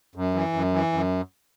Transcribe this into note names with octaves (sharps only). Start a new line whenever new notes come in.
F#2
E3
F#2
E3
F#2